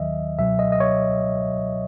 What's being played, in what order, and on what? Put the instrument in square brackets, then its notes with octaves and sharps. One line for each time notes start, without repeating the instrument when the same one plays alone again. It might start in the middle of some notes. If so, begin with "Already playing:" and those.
Already playing: [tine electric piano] D#2 D#3 F#3 D#5 E5
C#2 B2 F#3 E5
D#5
D#5
C#5